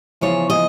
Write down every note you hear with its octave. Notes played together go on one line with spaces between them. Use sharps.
E2 C#3 F3 C#5
D#5